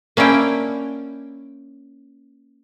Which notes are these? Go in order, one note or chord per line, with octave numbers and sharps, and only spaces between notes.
A#3 C#4 D4 E4 G5